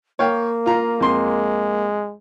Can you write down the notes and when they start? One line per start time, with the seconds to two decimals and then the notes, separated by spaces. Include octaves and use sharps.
0.19 A#3 C#5 F5 G5
0.66 F4 A#5
1.00 F2 G#3 C6